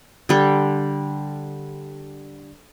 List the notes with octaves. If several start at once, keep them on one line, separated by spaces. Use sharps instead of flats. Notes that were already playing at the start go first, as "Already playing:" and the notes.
D3 G3